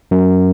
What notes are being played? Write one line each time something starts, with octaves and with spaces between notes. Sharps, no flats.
F#2